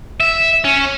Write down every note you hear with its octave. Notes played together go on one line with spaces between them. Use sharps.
E5
C#4